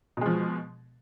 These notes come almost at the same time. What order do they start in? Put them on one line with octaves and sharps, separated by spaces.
B2 G#3 F3